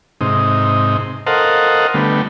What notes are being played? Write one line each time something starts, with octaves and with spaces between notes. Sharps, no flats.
G#2 C3 D#4
A4 A#4 C5 D#5 F5 F#5
D3 G3 A3 B3